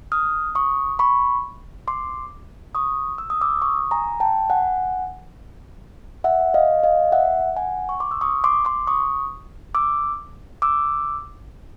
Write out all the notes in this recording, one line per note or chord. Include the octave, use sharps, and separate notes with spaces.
D#6 F6
C#6 D#6
B5 C#6
C6 D6
C#6 D#6
E6
D#6
D6 E6
C#6 D#6
G#5 A#5
G5 A5
F#5 G#5
E5 F#5
D#5 F5
D#5 F5
E5 F#5
F#5 G#5
C#6
C6 D6
E6
C#6 D#6
C6 D6
C6 D6
C#6 D#6
D6 E6
D6 E6